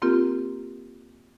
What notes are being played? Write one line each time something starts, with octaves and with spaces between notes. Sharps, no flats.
A#3 C4 F4 G4 A#4